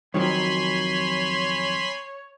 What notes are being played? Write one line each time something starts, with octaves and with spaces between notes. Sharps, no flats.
F2 D#3 F#3 C#5 G#5 B5 C6